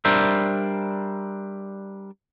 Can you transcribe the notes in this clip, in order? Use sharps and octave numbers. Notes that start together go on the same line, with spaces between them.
G3 D4 A#4 C5 E5